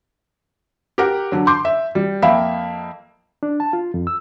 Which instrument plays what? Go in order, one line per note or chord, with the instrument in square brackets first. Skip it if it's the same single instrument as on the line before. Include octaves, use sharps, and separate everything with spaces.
[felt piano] G4 A#4 F#5
D3 F#3
C6 D6 G6
E5
G3
F2 A#3 E5 F5 G5 B5
[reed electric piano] D4
A5
F4
F2
E6